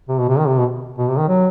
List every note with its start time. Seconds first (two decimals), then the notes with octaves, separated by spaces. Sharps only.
0.09 C3
0.18 B2
0.29 C3
0.38 D#3
0.48 C3
0.58 B2
0.98 B2
1.08 C3
1.18 D#3
1.28 F#3